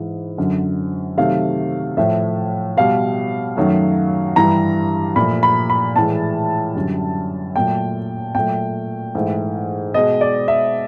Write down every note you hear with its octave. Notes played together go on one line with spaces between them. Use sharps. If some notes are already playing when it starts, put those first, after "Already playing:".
Already playing: G#2 E3 G#3
F#2 D3 F#3
C3 D#3 F#3 A3 F5
A2 F3 A3 E5
B2 G3 F5
F#2 D#3 F#3 A3
G2 E3 G3 A#5
A#2 F3 A3 B5
B5
B5
A2 E3 G#3 A5
F#2 D3 G3
A#2 F#3 A3 G5
A#2 F#3 A3 G5
G#2 E3 A3
B2 G#3 D#5
D5
E5